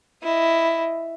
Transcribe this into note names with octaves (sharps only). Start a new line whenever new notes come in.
E4 D#5